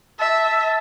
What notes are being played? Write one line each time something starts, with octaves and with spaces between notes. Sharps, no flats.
E5 A5